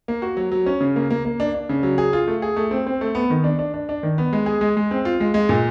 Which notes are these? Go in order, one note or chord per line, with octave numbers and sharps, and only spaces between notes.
A#3
F#4
F#3
F#3
C#4
C#3
A#3
A#3
A#3
D4
D4
C#3
F#3
G#4
F4
A3
G#4
A3
C4
C4
A3
B3
D#3
D4
D4
D4
D4
D#3
B3
G#3
G#4
G#3
G#3
C4
F4
G#3
G#3
A#2